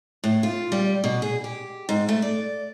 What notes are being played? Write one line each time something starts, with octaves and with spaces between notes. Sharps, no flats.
A2
F4
G3
B2
G#4
G4
G#2
A3
D5